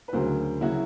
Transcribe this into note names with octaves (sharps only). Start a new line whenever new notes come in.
B4
D2 C#3 F#3 A#4 C5
C#3 F#3 E4 F#4